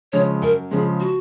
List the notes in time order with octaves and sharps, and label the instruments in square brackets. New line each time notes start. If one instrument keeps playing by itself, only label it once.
[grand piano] C#3 F3 G#3 [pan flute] C#5
[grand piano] F#2 [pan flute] A#4
[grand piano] C#3 F3 G#3 [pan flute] G#4
[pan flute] F#4